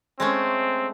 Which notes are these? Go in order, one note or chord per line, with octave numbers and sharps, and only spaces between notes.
G#3 A3 C4 C#4